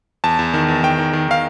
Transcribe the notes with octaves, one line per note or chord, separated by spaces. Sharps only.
E2 A5
E2
D#3
E2
D#3 G5
D#3
D#3
D#3 F5